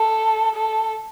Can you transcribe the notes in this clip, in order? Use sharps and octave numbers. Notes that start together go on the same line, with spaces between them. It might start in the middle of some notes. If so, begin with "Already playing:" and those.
Already playing: A4
A4